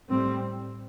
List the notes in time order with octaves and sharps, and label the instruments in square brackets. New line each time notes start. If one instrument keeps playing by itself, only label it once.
[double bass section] A2 G3 C4